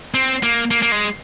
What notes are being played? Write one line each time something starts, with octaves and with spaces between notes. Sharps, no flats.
C4
A#3
A#3
A#3
G#3